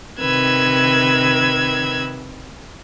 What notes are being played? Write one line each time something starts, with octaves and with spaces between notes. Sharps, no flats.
C3 D#3 B4 E6 G#6